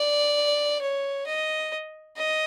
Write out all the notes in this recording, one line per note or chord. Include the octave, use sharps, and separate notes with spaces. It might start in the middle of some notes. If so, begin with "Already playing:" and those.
Already playing: D5
C#5
D#5
D#5